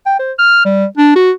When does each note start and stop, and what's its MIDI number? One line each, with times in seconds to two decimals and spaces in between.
0.06 0.15 79
0.20 0.32 72
0.39 0.64 89
0.65 0.85 55
0.98 1.12 62
1.16 1.31 66